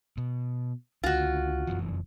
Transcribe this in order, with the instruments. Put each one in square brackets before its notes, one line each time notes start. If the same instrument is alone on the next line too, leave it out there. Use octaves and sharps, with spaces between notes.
[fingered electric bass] B2
[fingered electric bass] C#2 D3 [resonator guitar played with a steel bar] F4 F#4
[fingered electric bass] F1 F#2 E3